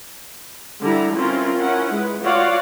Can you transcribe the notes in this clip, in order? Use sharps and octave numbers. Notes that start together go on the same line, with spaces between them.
D3 E3 G3 E4 A#5
C4 C#4 E4 F4 A#4
C#4 E4 A#4 F#5
G#3 B4
F4 F#4 C#5 D5 F5 F#5